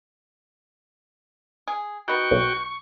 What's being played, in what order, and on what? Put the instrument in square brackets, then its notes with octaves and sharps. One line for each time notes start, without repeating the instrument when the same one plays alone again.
[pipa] G#4
[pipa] D#3 B3 [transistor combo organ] F#4 G5 [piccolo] C#6
[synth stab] B1